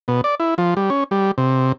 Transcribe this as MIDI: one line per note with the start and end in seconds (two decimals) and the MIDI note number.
0.08 0.21 47
0.24 0.35 74
0.40 0.54 64
0.58 0.74 53
0.77 0.90 55
0.90 1.04 61
1.11 1.31 55
1.38 1.72 48